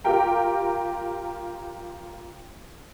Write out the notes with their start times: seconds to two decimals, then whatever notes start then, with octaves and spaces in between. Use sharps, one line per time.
0.04 F4 G4 A#4 G5 A#5